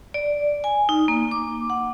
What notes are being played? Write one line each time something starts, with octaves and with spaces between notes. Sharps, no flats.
D5
G#5
D#4
A#3
D6
F#5